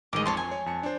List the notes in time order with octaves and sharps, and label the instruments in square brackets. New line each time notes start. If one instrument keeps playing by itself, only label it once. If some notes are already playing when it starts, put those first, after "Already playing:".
[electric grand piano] A1 D#3 G#3 [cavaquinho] D#5 D6
[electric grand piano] F2 [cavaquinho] C#5 A5 C6
[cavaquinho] G#5
[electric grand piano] C#5
F2 A5 C#7
D4 C5